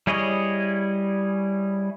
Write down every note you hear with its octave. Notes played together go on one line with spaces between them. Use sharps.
G3 E4 G#4 C#5 D#5